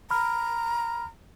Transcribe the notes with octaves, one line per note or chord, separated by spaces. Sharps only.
A#5 B5 F6